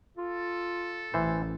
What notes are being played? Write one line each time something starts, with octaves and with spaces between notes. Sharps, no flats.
F4 A4
A1 E3 C5